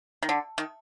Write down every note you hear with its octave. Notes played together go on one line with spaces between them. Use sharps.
D#3
D3
D#3